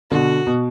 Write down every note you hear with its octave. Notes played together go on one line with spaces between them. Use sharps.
B2 D3 F#4
B2